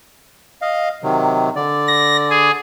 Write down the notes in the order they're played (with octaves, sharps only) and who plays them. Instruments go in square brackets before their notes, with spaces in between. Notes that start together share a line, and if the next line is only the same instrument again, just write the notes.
[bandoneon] D#5 F5
C3 D#3 F#3
D3 D5
[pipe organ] A#6
G#4